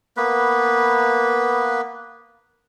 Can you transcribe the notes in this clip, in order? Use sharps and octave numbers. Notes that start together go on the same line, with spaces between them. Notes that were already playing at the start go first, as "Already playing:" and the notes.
A#3 B3 B4